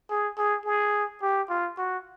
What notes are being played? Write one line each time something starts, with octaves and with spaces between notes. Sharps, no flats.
G#4
G#4
G#4
G4
F4
F#4